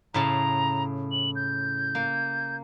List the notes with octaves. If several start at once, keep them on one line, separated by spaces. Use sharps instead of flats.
A2 C#3 A5 A#5
F#7
G6
A#3